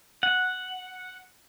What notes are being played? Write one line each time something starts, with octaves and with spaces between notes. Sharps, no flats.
F#5